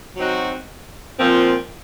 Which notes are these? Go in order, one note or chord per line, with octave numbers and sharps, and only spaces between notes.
F#3 C4 D#4 F#4
A#2 F3 C4